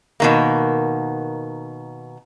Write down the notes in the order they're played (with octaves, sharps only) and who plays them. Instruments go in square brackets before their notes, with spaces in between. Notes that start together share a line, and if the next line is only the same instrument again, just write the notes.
[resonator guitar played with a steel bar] B2 D#3 A#3